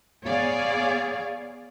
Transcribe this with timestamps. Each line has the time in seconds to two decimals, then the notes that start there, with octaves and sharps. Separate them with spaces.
0.25 B3 G#4 C#5 D5 F5